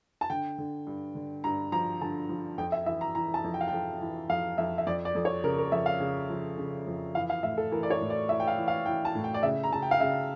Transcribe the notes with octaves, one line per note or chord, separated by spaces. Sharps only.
A5
D3 G5
D3
G2
D3
G2 A#5
F3 A#5
D3 A5
F3
F2 G5
E5
E3 E5
A#5
E3 A#5
A5
F2
G5
F5
F2 G5
E3
F2 F5
F2 E5
E5
F2 D5
D5
F2
C#5
C#3 A#4
A#4
F2 E5
F5
C#3
F3
C#3
F2
E3 F5
F5
A2 E5
A4
E3 A#4
D5
C#5
A2
D5
E3 E5
G5
F5
E3
F5
E3 G5
A5
A2
G5
D5
C#3 E5
A#5
C#3 A5
G5
F5
C#3 E5